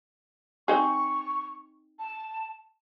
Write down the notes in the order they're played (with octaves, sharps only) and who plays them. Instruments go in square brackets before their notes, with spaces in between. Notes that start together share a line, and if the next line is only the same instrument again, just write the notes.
[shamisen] C4 D#4 G#4 [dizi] C#6
[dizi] A5